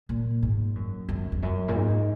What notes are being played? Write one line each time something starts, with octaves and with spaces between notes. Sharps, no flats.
A#2
G#2
F#2
F#2
E2
F#2
A#2
G#2